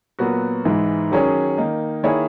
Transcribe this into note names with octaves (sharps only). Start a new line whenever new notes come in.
A#2 F#3 B3 F#4
G#2 E3 G#3
D#3 F#3 C#4 G#4 C#5
D#3 A#3 D#4
D#3 A#3 E4 G#4 C#5